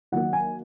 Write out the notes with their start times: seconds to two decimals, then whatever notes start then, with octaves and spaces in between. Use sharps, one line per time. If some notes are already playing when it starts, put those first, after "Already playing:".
0.12 D#3 F#3 A#3 F#5
0.33 G#5